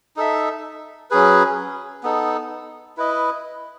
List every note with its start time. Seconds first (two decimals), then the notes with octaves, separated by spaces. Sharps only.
0.16 D#4 A4 E5
1.11 F#3 C#4 G#4 B4
2.03 B3 D#4 A4
2.97 E4 B4 D#5